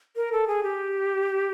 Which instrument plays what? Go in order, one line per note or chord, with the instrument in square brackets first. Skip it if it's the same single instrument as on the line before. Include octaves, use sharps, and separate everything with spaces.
[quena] A#4
A4
G#4
G4